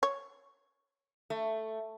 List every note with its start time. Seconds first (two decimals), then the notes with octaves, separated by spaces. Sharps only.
0.03 C#5
1.30 A3